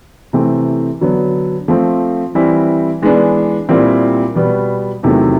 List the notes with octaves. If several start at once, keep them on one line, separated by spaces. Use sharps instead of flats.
C3 E3 A3 C4
D3 F#3 B3
F3 A3 C4
E3 G3 C4 E4
E3 G#3 B3 D4
A#2 G3 C4 E4
B2 G3 B3
E2 C3 D#3 F#3 A3